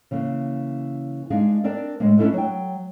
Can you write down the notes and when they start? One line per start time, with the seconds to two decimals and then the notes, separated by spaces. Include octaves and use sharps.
0.11 C#3 E3 A#3
1.30 G#3 D4 D#4 G#4 F5
1.64 C4 D4 A#4 D5
2.00 A2 G#3 A#3
2.18 A3 C#4 D4 E4 A4 B4
2.33 F#3 G5